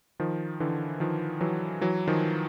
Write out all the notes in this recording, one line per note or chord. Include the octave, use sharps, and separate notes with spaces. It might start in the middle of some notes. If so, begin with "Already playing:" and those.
D#3 F3
D3 E3
D#3 F3
E3 F#3
E3 F#3
D#3 F3